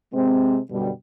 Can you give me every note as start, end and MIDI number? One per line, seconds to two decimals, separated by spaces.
0.13 0.58 48
0.13 0.58 56
0.13 0.58 60
0.71 0.90 42
0.71 0.90 47
0.71 0.90 50
0.71 0.90 55